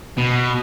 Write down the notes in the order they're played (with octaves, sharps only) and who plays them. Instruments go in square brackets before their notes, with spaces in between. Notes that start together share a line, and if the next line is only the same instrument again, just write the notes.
[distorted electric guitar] B2